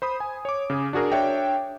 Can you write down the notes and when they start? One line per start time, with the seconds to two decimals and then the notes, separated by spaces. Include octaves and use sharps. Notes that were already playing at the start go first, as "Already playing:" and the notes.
0.02 C5 B5 D#6
0.20 G#5
0.45 C#5 D6
0.70 C#3 G#4
0.93 D4 F#4 G#4 A#4
1.12 D4 C#5 E5 G5